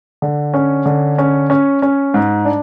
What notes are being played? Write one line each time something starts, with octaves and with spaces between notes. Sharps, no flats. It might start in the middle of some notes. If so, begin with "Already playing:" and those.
D3
C#4
D3
C#4
C#4
C#4
G#2
D4